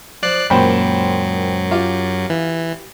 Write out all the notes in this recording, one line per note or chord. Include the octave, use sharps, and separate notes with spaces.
F3 D5 F#6 C7
C#2 F#2 A#2 F#3 C5 G5 B5
F4 G4
E3